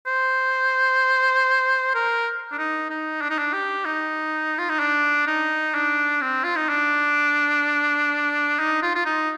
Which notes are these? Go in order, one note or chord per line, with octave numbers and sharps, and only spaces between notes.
C5
A#4
D4
D#4
D#4
D4
D#4
D4
G4
D#4
F4
D#4
D4
D#4
D4
C4
F4
D#4
D4
D#4
F4
F4
D#4